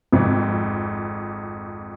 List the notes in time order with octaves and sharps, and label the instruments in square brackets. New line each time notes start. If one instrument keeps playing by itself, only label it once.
[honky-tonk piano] G#1 F2